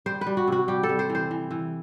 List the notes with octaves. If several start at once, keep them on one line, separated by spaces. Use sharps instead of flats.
G3 C5
B4
G3
F#4
C3 F#4
G3 G4
A4
G3
C5
E3
C5
E3
E3